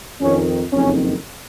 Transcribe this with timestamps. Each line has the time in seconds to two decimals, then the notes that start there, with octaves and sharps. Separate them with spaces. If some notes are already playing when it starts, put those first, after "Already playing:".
0.21 F2 D#3 C#4
0.73 F#1 F2 D#3 C#4